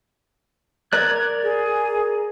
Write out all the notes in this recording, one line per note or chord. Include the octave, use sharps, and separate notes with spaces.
A#4 D5 F#6 G#6
G#4